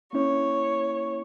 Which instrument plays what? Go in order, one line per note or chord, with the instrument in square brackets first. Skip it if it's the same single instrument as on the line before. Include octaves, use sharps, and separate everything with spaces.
[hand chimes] A#3 C#4 E4 [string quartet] C#5